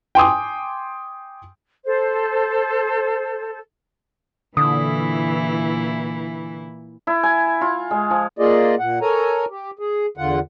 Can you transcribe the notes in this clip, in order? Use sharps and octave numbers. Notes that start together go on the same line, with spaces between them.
G5 G#5 C6 D6 D#6
A4 C5
A#2 D3 E3 E4 D#6
E4
G#5
F4
G#3
F3
A#3 F4 G#4 D5 D#5
A#2 F#5
A4 A#4 C#5 G#5 A#5
G4
G#4
E2 D3 F4 F#5